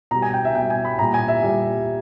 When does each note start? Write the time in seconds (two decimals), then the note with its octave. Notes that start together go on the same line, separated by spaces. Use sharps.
0.11 B2 A#5
0.15 G3
0.22 G#5
0.34 G5
0.45 E5
0.55 B2 G3 G5
0.70 G#5
0.85 B5
0.99 A#2 G3 A#5
1.14 G#5
1.28 E5
1.43 A#2 G3